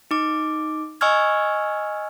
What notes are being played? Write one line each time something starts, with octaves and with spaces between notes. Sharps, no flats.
D#4 D6
D#5 G#5 C#6 E6 F6 G#6